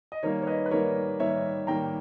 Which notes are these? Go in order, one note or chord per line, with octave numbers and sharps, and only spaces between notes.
D#5
D#3 G3 A#3 A#4 C#5
C#5
B4 D#5
B4
D#3 G3 A#3 A#4 C#5
D#3 G3 A#3 C#5 E5
D#3 G3 A#3 G5 A#5